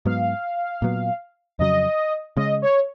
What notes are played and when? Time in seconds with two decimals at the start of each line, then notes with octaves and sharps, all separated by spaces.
0.05 G#2 F#3 B3 F5
0.82 A#2 F#3 B3
1.59 F2 C#3 F#3 D#5
2.37 C#3 G#3 C#4 D#5
2.62 C#5